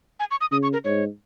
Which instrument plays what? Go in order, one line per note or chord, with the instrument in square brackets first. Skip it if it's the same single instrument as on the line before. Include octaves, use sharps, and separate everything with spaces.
[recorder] G#5
C#6
D#6
[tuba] C#3 [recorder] D#6
[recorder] C#6
A#4
[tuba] G#2 [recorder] C#5